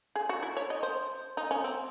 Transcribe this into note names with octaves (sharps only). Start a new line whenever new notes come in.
G#4
F#4
E4
C#5
D#5
C5
D#4
C#4
C4